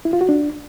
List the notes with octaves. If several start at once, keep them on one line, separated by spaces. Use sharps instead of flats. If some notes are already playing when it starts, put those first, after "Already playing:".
E4
F4
F#4
D4